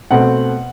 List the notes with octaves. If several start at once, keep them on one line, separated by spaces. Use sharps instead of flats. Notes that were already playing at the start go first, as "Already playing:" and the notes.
B2 A3 C4 F#5